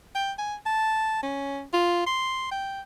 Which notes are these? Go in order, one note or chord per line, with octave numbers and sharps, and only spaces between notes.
G5
G#5
A5
C#4
F4
C6
G5